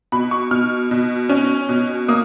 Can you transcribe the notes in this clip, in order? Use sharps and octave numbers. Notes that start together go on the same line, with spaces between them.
B2 B5
C#6
B2 F6
B2
C#4
B2
A#3 D#6